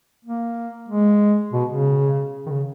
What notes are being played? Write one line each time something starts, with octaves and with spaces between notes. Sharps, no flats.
A#3
G#3
B2
C#3
D#3
C#3